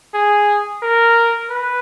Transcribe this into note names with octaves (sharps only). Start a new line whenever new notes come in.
G#4
A#4
B4